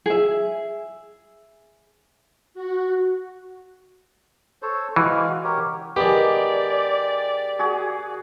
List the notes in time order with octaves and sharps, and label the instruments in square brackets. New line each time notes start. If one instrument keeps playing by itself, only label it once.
[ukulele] G#4 E5
[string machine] F#4
[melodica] A4 C5 C#5
[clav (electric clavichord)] E3 [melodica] G#3 F#4 F5
[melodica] G4 A#4 C#5
[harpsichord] D#3 B3 [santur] G#3 [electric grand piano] G4 [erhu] D5
[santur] F#4 G#4